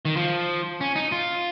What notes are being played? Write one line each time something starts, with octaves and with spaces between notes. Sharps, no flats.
D#3
F3
C#4
D#4
F4